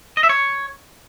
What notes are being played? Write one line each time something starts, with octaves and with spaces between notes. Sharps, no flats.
D#5
E5
C#5